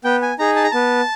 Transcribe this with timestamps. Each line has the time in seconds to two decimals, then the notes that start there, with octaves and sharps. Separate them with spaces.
0.04 B3 G5
0.22 G#5
0.39 D#4 G#4 A#5
0.56 A5
0.64 A#5
0.71 B3 A5